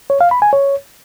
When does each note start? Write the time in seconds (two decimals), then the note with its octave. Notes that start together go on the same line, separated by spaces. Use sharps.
0.10 C#5
0.21 F5
0.31 B5
0.42 G#5
0.53 C#5